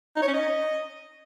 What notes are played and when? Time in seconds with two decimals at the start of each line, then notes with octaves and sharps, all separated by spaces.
0.16 D#4
0.22 C#5
0.28 C#4
0.34 D#5